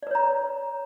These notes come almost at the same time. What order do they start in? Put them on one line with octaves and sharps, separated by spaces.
D5 B4 C#5 A#5